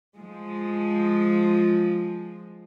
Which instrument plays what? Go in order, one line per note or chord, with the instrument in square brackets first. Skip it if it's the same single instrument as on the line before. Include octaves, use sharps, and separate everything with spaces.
[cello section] F3 G#3